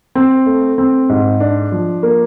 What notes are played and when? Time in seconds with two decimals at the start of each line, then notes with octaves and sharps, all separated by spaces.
0.15 C4
0.46 A3
0.78 C4
1.09 G#2
1.40 D4
1.72 F3
2.03 A#3